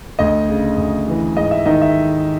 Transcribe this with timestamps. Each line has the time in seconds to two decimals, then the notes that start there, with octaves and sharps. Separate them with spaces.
0.19 D2 D#5
0.49 C#3
0.78 D2
1.08 E3
1.36 G#2 D#5
1.51 E5
1.66 D#3 D#5
1.82 E5